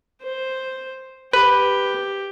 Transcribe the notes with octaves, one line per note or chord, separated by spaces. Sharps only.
C5
G4 B4